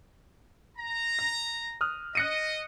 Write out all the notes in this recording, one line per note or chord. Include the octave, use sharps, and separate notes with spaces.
A#5
A#6
D#6 F6 F#6
D#5 F#6 C#7 D#7